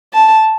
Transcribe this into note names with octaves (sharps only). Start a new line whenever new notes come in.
A5